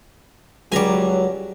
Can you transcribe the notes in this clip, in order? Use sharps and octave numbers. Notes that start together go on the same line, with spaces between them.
C#2 F#3 G3 G#5 A#5